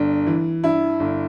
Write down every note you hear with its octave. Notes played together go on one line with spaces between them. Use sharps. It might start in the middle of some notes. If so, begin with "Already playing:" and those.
Already playing: G1 D4
E3
G2 E4
G1